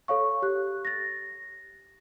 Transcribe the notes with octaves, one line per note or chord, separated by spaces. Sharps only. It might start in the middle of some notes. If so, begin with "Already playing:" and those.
A4 C#5 F5 C#6
G4 F#6
A6 A#6